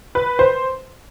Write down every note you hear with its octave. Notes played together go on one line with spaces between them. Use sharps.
B4
C5